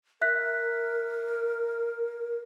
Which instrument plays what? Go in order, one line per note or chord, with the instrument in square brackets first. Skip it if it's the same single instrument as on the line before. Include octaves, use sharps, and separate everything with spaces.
[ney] A#4 [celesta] E5 F#6 B6